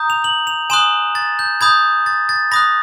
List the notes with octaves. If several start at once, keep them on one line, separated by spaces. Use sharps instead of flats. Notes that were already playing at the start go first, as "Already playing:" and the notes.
Already playing: A#5 D#6 G6
F7
F#7
F7
G#5 C6 D#6 F#6 E7
A6
G6
B5 D#6 G6 G#6
A6
A6
B5 D#6 F#6 A#6